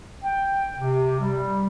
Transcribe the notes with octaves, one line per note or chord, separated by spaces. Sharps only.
G5
C3
G3